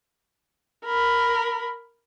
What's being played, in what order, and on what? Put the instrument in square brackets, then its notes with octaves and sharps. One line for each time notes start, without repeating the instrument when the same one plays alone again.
[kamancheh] A#4 B5